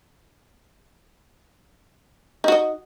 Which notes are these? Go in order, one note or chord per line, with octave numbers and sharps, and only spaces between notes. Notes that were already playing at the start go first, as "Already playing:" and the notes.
D#4 F#4 D#5